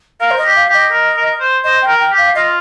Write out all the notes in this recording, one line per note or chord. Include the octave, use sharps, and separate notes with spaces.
A#4 F5
C5
D#5
G4
F5
G4
D#5
A#4
A#4
C5
C5 D#5
G5
A#4
G5
G4
F5
F4 D#5